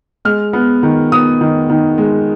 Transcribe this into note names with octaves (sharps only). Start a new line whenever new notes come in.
G#3 F6
B3
D#3
B3 D#6
D#3
D#3
G#3